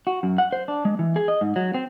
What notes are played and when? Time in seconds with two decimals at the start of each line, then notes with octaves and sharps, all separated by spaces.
0.07 F#4
0.23 F#2
0.38 F#5
0.53 C5
0.68 D4
0.85 G#3
0.99 E3
1.16 G#4
1.28 D#5
1.41 G#2
1.56 F#3
1.74 C4